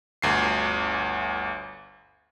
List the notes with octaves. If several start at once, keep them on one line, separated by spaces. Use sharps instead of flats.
G1 D2 C7